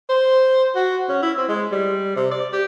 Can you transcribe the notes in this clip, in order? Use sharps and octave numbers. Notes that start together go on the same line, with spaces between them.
C5
F#4
C#4
E4
C4
G#3
G3
C3
D5
G4